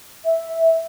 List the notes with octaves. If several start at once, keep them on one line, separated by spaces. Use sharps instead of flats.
E5